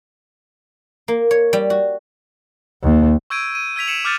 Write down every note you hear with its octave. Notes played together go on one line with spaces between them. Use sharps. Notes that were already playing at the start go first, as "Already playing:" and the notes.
A#3
C#5
G3
F#4
D#2
C#6 E6 G6 G#6 D7 D#7
D#7
E6 G#6 B6 F7
C#7 D7 E7 F#7
D6 F6 G6 A6 C#7 D#7